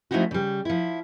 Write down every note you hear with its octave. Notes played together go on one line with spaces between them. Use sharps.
F3 A3 C#4 D#4 E4 F#4
C#3 G3
F3 E4